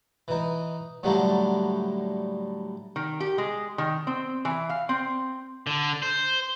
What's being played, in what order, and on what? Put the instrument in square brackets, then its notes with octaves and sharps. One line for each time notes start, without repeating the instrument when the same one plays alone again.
[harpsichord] E3 D#4
A2 D3 F#3 G3 A3 A#3
[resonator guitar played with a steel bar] D#3
G4
G#3
D#3
C4
E3
F5
C4
[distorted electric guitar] D3
C5